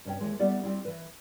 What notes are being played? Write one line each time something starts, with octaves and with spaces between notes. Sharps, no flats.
G2 C3 C#4 B4 G5
D#2 E3 G#3
G3 A3 B3 E4 G4 D5
G3 C4 E4
E3 B4